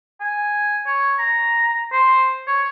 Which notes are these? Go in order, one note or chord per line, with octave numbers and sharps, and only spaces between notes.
G#5
C#5
A#5
C5
C#5